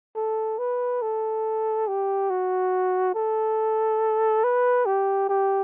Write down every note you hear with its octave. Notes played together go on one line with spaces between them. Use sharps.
A4
B4
A4
G4
F#4
A4
B4
G4
G4